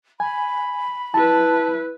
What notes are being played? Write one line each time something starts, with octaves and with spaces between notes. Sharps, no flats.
G#5 B5
E4 B4 A5